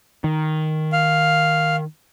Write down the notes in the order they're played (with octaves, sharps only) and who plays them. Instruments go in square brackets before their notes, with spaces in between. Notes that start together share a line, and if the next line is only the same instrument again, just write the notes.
[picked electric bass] D#3
[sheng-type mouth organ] F5